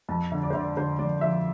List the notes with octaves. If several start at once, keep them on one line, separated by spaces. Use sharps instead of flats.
F2 A5
D3
D5
C5
D3
D5
D3 C5
F2 D5
F3 E5